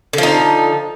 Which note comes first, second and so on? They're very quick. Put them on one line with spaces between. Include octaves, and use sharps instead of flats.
D3 F3 D#4